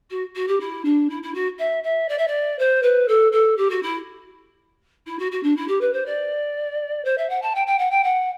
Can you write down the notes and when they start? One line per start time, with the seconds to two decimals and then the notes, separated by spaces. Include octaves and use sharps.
0.10 F#4
0.35 F#4
0.47 G4
0.60 E4
0.84 D4
1.09 E4
1.22 E4
1.34 F#4
1.58 E5
1.83 E5
2.08 D5
2.18 E5
2.27 D5
2.58 C5
2.82 B4
3.08 A4
3.32 A4
3.57 G4
3.70 F#4
3.82 E4
5.06 E4
5.19 F#4
5.31 F#4
5.43 D4
5.56 E4
5.67 G4
5.81 B4
5.93 C5
6.06 D5
7.04 C5
7.17 E5
7.29 F#5
7.42 A5
7.55 G5
7.66 G5
7.78 F#5
7.91 G5
8.03 F#5